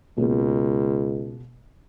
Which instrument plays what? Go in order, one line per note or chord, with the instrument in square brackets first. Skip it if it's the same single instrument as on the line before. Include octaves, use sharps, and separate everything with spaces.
[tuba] C#2 [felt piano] B2 G#3 A#3